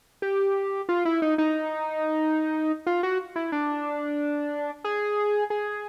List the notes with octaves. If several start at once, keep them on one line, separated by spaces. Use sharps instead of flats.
G4
F4
E4
D#4
D#4
F4
F#4
E4
D4
G#4
G#4